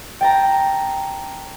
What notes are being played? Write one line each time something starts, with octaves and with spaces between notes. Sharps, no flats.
G5 A5 A#5